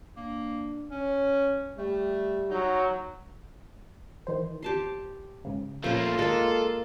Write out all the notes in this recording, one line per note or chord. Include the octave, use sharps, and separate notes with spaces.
A#3 D4
C#4 C#5
G3 A3
F#3 D#4
D#3 E3 C5
G4 A5 C6
G#2 C#3
A#2 F3 A3 A#3 C#4 F4 C5 B5
G#2 G#3 A#3 A4